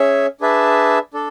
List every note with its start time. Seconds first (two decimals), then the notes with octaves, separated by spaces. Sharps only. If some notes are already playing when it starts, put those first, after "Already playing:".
Already playing: C#4 G#4 C#5 E5
0.41 D4 G#4 B4 E5 A5
1.14 D4 A4